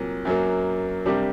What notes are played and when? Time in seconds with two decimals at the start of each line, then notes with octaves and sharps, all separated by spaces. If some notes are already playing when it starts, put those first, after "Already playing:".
Already playing: C2 A#2 F#3 A#3
0.25 F#2 F#3 A#3
1.06 C3 G3 D4 G4 A#4